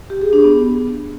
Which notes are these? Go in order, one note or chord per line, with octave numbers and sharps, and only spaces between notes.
G4
G#4
D4
B3